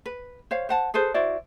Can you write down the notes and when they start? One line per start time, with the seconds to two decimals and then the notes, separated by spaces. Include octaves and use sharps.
0.06 B4
0.51 C5 C#5 F5
0.69 C5 F#5 A5
0.94 G#4 A4 B4 C5
1.14 E4 F#4 C5 D5